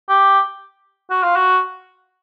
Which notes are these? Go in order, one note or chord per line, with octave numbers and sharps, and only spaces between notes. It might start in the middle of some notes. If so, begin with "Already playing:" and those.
G4
F#4
F4
F#4